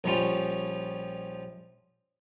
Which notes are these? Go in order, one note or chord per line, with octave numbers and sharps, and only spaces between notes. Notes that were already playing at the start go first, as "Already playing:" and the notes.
A#1 F3 G3 C#4 F4